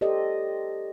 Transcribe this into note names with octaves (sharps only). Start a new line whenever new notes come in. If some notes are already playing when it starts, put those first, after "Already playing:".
G4 A4 C5 D5 D#5